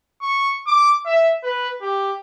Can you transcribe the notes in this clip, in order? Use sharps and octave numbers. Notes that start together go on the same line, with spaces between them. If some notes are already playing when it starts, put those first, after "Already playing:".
C#6
D6
E5
B4
G4